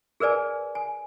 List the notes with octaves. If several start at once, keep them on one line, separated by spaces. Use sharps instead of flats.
G#4 A#4 B4 D5 G#5
G#5